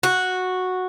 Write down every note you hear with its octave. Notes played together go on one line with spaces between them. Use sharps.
F#4